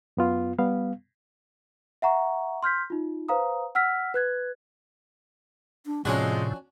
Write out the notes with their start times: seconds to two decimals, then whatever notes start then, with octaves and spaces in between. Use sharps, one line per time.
0.17 F#2 B3 F4
0.59 G3 B3 F5
2.02 E5 F#5 A#5 C#6
2.63 C6 F6 G6 B6
2.90 D#4 F4
3.29 B4 C5 F5 A#5 D#6
3.75 F#5 E6 F6 B6
4.14 B4 F#6 G#6
5.86 D4
6.05 F2 A2 C3 F3 G#3 C#4 D4 F#4